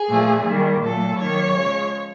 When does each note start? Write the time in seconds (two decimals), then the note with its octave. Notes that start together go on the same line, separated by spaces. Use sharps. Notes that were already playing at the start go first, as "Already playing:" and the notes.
Already playing: G#4
0.10 A#2 F3 A3
0.46 D#3 G3 A#3
0.82 A#2 F#3 A3 A4
1.19 D#3 F#3 A#3 C#5
1.55 C#3 F3 G#3